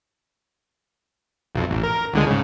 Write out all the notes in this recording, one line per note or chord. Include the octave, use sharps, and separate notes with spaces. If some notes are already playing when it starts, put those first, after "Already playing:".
B1 F2
A1
A#4
C#2 D3 G#3
G#2 C#3